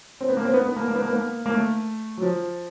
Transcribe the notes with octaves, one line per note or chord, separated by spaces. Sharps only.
C4
B3
A#3
C4
B3
B3
A#3
A#3
B3
A#3
B3
A#3
A#3
A3
F#3
F3